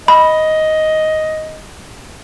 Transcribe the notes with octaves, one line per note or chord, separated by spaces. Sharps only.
D#5 B5